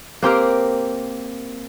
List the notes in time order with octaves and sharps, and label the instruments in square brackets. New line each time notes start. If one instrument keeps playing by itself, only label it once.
[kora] A#3 C4 G4 A#4